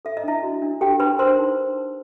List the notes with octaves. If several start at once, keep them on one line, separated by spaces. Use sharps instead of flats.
A4 E5
D#5
D4 E4 E5
F#4
D4
G4 A4 G5
D4 B4 B5
A#4 C5 C6
D#4